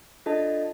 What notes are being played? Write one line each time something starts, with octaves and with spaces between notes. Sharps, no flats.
D4 F4 A4 D#5 A5